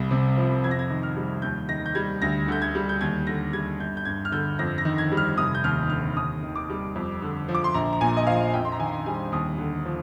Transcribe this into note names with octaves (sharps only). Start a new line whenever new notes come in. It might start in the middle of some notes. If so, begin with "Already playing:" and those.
Already playing: C2 G3
C3
F3
F2 G#6
A#6
G#6
D#3
F6
G3
D#2 G6
D#3 A#6
G6
G3 G#6
D2 A#6
D3 G6
G#6
G3
G6
D#2 G#6
D3 A#6
G3 G#6
G1 G6
G6
G2 G#6
F6
D3 G6
F2 A#6
A#6
D#3
G#6
G3
F6
F1 D#6
G6
D#2 F6
D3 F6
D#2 D#6
D#3
D6
G3
F2
D3
F3
D6
C6
A#1 A#5
A#5
A#2 G#5
D#5
F3 F5
F2 G5
C6
A#5
D#3 G#5
G3 G#5
D#2 D#6
D3
F3